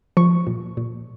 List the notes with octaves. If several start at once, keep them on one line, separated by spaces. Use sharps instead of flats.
F3 C#6
A#2
A#2